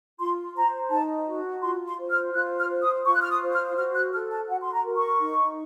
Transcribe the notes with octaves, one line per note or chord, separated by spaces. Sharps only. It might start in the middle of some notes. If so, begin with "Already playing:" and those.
F4 C6
C5 A#5
D#4 A5
F#4
F4 C6
C6
C5
F6
F4 F#6
F6
C5
D#6
F4 C#6
F#6
F6
D#6
C5
F6
F#4 F6
F#6
A4 F6
A5
F#4 F#5
C6
A#5
A#4
C#6
D#4